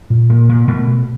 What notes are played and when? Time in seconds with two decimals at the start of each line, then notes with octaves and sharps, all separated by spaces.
0.10 A#2
0.30 A#2
0.49 A#2
0.67 B2 A3
0.87 B2